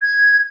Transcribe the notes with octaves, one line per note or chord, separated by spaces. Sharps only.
G#6